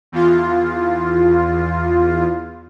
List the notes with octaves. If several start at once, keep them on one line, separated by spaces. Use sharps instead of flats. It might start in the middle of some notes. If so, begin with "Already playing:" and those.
E2 F4